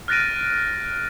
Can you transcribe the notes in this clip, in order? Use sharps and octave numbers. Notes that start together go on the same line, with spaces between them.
F6 F#6 A6 A#6 D7 D#7